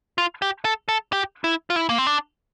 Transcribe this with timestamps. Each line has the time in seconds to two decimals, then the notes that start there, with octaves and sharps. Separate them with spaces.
0.18 F4
0.42 G4
0.65 A4
0.89 A4
1.13 G4
1.44 E4
1.70 F4
1.76 E4
1.89 A#3
1.98 C4
2.07 D4